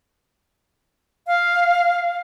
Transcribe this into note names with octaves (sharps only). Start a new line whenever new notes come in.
F5